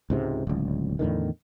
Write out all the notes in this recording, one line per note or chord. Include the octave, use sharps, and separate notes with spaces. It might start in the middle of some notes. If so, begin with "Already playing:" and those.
C#2 G#2 C3
D1 C#2
E2 A2 D3 D#3